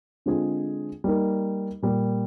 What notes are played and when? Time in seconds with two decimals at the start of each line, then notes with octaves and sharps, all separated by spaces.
0.26 D3 G#3 C4 F4 G#4
1.04 G3 A#3 D#4 A#4
1.83 A#2 G3 A#3